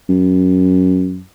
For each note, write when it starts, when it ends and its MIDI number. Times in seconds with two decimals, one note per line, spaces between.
0.09 1.20 42